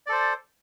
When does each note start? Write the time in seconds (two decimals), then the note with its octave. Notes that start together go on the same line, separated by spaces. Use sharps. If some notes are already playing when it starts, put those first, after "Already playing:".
0.07 D5
0.09 A4
0.12 C5